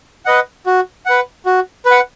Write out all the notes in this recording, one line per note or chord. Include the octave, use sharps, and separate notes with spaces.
B4 D#5 F#5
F#4
B4 F#5
F#4
B4
F#5